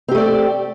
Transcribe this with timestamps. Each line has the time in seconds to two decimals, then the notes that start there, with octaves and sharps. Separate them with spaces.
0.08 C4
0.11 G4
0.15 A3
0.18 D5